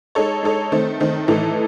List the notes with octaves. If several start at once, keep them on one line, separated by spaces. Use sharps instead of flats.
G#3 D#4 A4 C#5
G#3 D#4 A4 C#5
D#3 A3 C4
D#3 A3 C4
A2 E3 A3 D#4 A4